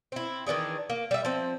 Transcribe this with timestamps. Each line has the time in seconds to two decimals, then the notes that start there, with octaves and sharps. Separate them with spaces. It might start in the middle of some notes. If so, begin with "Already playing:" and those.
0.12 C4 E4
0.47 D#3 E3 D4 G#4
0.90 A#3
1.11 G3 E5
1.25 F3 C4